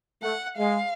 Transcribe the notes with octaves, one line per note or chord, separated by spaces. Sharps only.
A3 F#5
G#3 F5